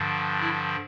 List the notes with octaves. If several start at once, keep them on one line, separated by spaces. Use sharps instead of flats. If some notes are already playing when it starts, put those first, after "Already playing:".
Already playing: G2 D3 F3
E4